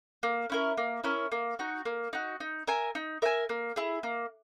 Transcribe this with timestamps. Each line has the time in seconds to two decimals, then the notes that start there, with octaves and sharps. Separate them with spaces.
0.23 A#3
0.50 C#4 E4 A#4
0.77 A#3
1.04 C#4 E4 A#4
1.32 A#3
1.59 D#4 F#4
1.85 A#3
2.13 D#4 F#4
2.40 D#4
2.67 A#4 E5 G#5
2.95 D#4
3.22 A#4 E5 G#5
3.49 A#3
3.76 E4 G#4
4.03 A#3